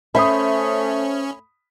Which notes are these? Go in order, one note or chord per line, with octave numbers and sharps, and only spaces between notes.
A3 C#4 C5 E5 B5 D#6